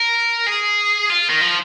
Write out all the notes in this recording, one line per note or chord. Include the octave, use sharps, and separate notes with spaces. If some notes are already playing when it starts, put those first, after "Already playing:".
Already playing: A#4
G#4
F4
D#3
F3